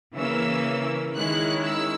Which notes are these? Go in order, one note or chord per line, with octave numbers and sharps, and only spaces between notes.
C#3 E3 A#3 C#4 E6
D#3 G#3 C#4 E4 F#6
E6